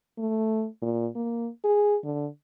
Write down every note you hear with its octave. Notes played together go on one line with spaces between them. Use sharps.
A3
A#2
A#3
G#4
D3